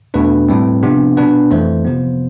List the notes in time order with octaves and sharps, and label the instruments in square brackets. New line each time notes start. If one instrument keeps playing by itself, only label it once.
[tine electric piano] E2 B2 A3 D4 B4
A2 G3 C4
C3 F3 B3 D4
B2 B3 D4 B4
F2 E3 A3 C5
C3 F3 B3